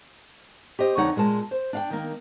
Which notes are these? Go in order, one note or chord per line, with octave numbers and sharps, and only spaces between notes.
G4 C5 D#5
F2 D3 D#4 C#5 F#5
A#2 G#3 F4 A5
C5
D4 F5 G5
D#3 A#3